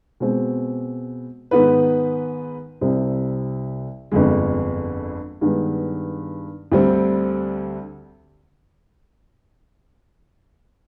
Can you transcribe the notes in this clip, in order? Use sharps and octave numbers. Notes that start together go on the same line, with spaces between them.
B2 G#3 C4
G#2 D#3 B3 D#4 B4
C2 C3 G3 C4
G1 F2 D3 G#3
G2 D#3 G#3 B3
D2 D3 G3 C4